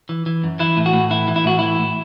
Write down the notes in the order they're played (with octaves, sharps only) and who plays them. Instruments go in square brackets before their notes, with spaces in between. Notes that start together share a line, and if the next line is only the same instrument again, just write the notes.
[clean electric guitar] E3
E3
F#2
E3 E4
A2
F#4
A2
E3 E4
E3
E4
A2 F#4
E3 E4
A2